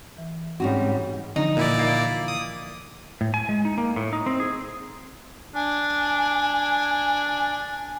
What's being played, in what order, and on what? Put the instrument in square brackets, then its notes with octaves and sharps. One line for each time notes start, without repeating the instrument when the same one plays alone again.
[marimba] E3
[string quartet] G#2 G3 [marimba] C4 [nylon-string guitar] C#4 D#4 F#4
[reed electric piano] D3 E3 F3 [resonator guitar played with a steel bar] D#4
[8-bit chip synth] A#2 E4 D5
[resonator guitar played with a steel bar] A#3
[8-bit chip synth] D#6
[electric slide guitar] A2
G#5
G#3
D#4
A#3
A2
D#4
C4
G#4
[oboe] D4 [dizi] G#5